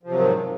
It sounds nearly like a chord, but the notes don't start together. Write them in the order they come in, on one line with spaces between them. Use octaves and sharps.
F3 C3 F#3 D#3 G#2